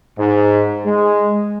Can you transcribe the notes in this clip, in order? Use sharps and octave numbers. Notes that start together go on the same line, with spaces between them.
G#2
G#3